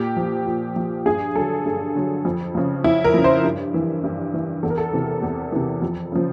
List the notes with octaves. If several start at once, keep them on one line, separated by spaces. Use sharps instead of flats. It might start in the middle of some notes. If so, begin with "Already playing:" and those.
Already playing: A#2 G4
F3
A#2
F3
G2 G#4
D3 F#3 A4
G2
D3 F#3
F2
C#3 F3
F2 E4
A#4
C#3 F3
C5
G2
E3
G2
E3
E2 A4
A#4
A4
C3 E3
E2
C3 E3
F2
C#3 F3